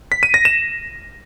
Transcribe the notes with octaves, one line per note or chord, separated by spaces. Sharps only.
B6
D#7
A#6
E7